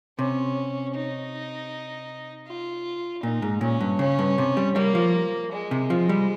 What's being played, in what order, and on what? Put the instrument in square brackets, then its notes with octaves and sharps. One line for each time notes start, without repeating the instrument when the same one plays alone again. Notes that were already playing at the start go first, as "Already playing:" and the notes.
[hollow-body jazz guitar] C3 [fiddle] C#4
[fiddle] D#4
F4
[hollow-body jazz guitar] A#2 [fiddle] D#4
[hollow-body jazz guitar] G#2
[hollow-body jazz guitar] A#2 [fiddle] C#4
[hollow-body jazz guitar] G2
[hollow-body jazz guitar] C#3 [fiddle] C#4
[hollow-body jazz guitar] G2
C3
G3
[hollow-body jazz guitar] G3 [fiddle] A#3
[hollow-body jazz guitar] F3
[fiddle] G#3
[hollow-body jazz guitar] C3
F3
G3